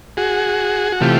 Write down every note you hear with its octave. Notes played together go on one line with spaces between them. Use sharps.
F#4 G#4
F#4
C3 E3 A3 F4 G4